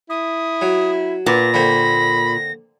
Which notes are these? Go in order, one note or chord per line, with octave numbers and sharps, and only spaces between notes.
E4 D#6
F#3
A#2 B3 A#6
D3 A#3 C4 B5